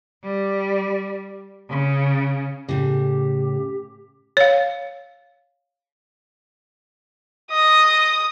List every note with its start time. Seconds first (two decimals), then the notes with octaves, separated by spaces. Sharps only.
0.24 G3
1.70 C#3
2.69 A2 C#3 G4
4.37 C#5 F5
7.51 D#5 D#6